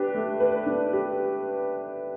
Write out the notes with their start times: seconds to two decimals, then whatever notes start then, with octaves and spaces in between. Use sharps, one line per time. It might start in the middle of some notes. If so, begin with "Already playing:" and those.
Already playing: D4 G4 B4
0.15 A3
0.40 B4
0.66 D4
0.93 G4